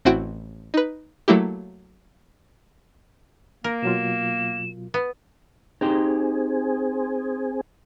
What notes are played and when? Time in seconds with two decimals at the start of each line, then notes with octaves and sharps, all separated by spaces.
0.05 A1 C4 E4 F#4 F#5 G5
0.74 D#4 B4
1.28 F#3 A3 A#3 E4 G4
3.64 A#3 A#4
3.83 B2 F#3 F4 E7
4.94 B3
5.81 C4 D#4 G4 G#4 C5